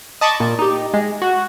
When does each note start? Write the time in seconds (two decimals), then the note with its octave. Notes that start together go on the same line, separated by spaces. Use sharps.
0.21 D#5 A5 B5 C#6 D6
0.40 A#2
0.59 D#4 G4
0.94 G#3
1.22 F#4